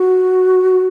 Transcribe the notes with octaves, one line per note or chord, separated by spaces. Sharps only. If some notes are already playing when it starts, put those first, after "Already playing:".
Already playing: F#4